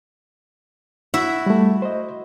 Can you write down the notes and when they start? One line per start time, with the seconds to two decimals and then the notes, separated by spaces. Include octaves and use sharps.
1.14 E4 F#4 E5
1.46 G3 A3
1.82 C5 D#5